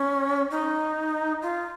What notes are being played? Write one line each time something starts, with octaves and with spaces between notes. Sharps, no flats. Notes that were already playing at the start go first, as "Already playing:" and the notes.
Already playing: C#4
D#4
F4